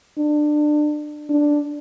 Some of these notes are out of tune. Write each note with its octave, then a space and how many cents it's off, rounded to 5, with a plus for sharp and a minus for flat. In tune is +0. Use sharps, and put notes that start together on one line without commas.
D4 +25
D4 +0